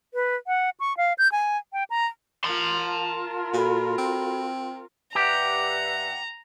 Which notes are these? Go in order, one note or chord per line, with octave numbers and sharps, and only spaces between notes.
B4
F#5
C#6
F5
G6
G#5
G5
A#5
F4 A#4 A5 C6
A#2 F#4 A4 B5
C4
G2 G4 E5 F#5 A#5